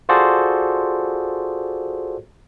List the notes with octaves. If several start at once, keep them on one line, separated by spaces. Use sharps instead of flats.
F4 F#4 G#4 A4 C5 D5